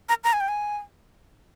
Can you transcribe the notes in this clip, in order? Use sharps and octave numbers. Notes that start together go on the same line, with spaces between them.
A#5
A#5
G#5
G5
G#5